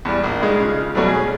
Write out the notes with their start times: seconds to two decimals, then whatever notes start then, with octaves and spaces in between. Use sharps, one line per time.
0.05 E2 G3
0.24 A#1
0.42 G3 G#3 D#4
0.60 C#3 F4
0.95 B2 F#3 G3 A3
1.08 C#4 G#4